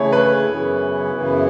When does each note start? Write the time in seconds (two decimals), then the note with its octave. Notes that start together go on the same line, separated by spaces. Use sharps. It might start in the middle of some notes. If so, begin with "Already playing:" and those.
Already playing: C#3 E3 A3 E4 G#4 C#5
0.13 B4
0.45 F#2 C#3 E3 B3 E4
1.12 F#2 C#3 E3 B3 E4